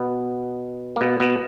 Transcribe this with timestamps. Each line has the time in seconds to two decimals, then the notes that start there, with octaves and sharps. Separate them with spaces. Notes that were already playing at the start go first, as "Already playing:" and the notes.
Already playing: B2 B3
0.96 A#3
1.01 B2 B3
1.20 B2 B3